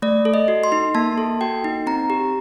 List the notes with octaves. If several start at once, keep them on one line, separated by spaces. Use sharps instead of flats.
A3 D5
A4
D#5
F#4
C6
D#4
A#3 A5
A4
F#4 G5
D#4
C4 A#5
G4